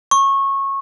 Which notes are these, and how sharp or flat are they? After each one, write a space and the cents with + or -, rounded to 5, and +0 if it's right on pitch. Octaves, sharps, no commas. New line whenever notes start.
C#6 -20